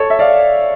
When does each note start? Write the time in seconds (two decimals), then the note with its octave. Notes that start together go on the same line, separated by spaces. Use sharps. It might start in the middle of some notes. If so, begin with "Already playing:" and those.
Already playing: A4 C#5
0.10 E5
0.19 D5 F5